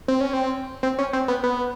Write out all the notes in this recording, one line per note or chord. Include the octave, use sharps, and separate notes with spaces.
C4
C#4
C4
C4
C#4
C4
B3
B3